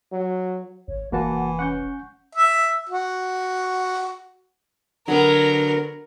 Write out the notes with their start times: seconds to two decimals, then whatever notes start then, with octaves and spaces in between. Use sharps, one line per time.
0.12 F#3
0.88 G#1 C#5
1.12 F1 E3 A#3 F#4 F#5 A5
1.59 C#4 F#5 C#6 G6
2.35 E5
2.89 F#4
5.08 D3 F#3 B3 A#4